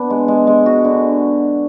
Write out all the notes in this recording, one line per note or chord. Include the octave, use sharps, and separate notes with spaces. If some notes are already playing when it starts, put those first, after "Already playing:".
Already playing: B3 D4
G#3
G#3
G#3
F#4
D3